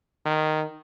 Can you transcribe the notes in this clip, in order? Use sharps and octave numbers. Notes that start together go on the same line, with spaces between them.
D#3